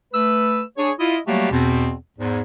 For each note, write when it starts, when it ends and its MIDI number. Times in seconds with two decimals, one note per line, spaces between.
0.14 0.61 57
0.14 0.61 71
0.14 0.61 88
0.78 0.92 62
0.78 0.92 68
0.78 0.92 73
0.99 1.18 64
0.99 1.18 65
0.99 1.18 75
1.27 1.50 54
1.27 1.50 55
1.27 1.50 57
1.27 1.50 58
1.27 1.50 66
1.27 1.50 67
1.51 1.94 40
1.51 1.94 47
1.51 1.94 60
2.19 2.41 40
2.19 2.41 44